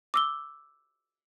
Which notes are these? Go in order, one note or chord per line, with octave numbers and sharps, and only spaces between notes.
D6 E6 G7